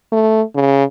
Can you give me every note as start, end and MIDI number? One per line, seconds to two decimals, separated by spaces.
0.12 0.42 57
0.55 0.84 49